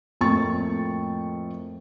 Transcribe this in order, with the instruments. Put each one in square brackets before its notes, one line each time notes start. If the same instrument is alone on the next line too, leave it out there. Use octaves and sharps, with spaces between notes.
[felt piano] F2 A2 A#3 G5 C#6 A6